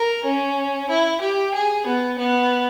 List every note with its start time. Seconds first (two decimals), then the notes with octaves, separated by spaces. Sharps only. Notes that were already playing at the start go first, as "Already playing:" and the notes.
Already playing: A#4
0.24 C#4
0.89 E4
1.21 G4
1.54 G#4
1.86 B3
2.18 B3